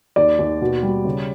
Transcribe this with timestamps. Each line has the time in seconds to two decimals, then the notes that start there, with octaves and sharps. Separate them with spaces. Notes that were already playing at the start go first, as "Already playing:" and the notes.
0.16 D#2 D5
0.39 D#2
0.61 B2
0.83 G3
1.05 C#3